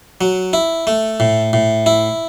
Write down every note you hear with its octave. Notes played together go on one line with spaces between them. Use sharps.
F#3
E4
A3
A2
A2
E4